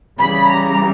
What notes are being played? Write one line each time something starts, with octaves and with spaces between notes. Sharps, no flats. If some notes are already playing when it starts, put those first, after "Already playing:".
C#3 E3 G3 B5
A#5